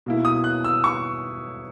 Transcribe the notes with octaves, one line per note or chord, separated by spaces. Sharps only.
B2 A#3 E4
D#6
F#6
E6
C#6